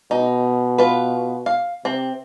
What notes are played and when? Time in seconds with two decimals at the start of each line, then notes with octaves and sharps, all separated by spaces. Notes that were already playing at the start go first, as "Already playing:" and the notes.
0.11 B2 D#4
0.78 F4 B4
1.46 F5
1.85 C3 C4